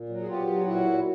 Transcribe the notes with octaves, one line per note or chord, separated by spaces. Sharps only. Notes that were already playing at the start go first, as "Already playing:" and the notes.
Already playing: A#2
F#3
G#4
B3 F4 G4
F#3
A#2 E4 F#4
A#2